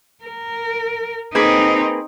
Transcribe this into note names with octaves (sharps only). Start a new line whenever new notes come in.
A#4
A#3 C4 D#4 G#4 B4